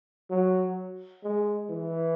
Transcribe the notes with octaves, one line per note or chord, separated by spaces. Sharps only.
F#3
G#3
E3